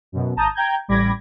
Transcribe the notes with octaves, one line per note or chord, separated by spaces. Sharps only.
F#2 B2
G#1 A5 A#5 D#6 G6
G5 A#5 G6 G#6
A1 G3 B5 D6 G#6 A#6